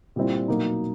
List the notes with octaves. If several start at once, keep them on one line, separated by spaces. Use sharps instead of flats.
A#2 G3 C4 E4
B2 F#3 A#3 D#4